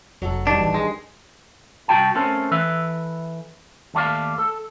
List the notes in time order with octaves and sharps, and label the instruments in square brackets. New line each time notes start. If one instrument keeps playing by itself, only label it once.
[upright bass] F1 [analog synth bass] F2 [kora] F#3 A4
[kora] G2 D#3 [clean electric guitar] D4
[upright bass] A1 [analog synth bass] E3
[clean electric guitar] G#3 [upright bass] D4
[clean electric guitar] C2 C#3 F#4 G5 A5
A3 C4 C#4 A4 A#4
E3 A4 B4 E5
D#2 A3 F4 D5 F5
A4